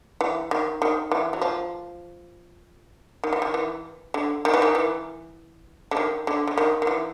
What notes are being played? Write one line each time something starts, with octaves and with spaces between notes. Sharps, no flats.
E3
D#3
D#3
E3
F#3
F3
D#3
E3
D#3
E3
D3
D#3
E3
D#3
E3
D3
D#3
D3
D3
D#3
D#3
E3